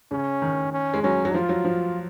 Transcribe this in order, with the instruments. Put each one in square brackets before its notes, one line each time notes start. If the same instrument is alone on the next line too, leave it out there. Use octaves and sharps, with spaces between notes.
[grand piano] C#3 [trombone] C#4
[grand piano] D#3
[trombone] C#4
[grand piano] G#3
[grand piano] F#3 [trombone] C#4
[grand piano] F#3
[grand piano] F3 [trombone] F4
[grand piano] F#3
F3